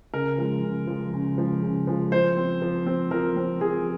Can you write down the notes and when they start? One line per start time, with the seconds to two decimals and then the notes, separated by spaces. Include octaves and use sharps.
0.14 C#3 A#4
0.38 F3 G#3
0.63 C#3
0.87 F3 G#3
1.13 C#3
1.38 F3 G#3
1.62 C#3
1.87 F3 G#3
2.12 F3 C5
2.37 C4
2.62 F3
2.86 C4
3.11 F3 A#4
3.36 C4
3.61 F3 G#4